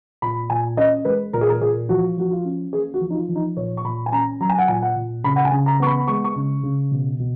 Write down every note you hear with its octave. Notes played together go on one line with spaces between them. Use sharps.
A#2 B5
A#2 G#5
C#4 D#5
G#3 B4
A#2 A#4
G#4
A#4
A#2 G#4
F3 F#4
F3 F#4
F4
C#4
A#3 G#4
F#4
F3
D#4
F4
F3
D#4
A#2 C#5
C#6
A#2 B5
G#5
C#4 A#5
F#3 A#5
G#5
F#5
A#2 G#5
F#5
A#2
C#3 B5
F#5
G#5
C#3
A#5
B3 C#6
B5
G#3 C#6
C#6
C#3
C#3
B2
B2